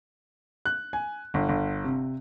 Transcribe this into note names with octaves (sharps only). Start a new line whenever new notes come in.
F#6
G#5
G1
G1
C3